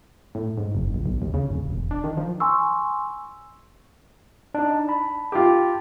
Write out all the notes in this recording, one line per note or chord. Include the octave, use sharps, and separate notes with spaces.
A2
G#2
F#1
A#1
B1
D#2
C#3
D1
E1
D4
D#3
F3
G#5 C6 C#6 E6
D4 D#4
A5 B5
F4 G4